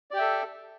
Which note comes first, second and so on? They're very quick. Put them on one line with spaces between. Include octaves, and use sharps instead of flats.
D5 G4 G5 E5 A4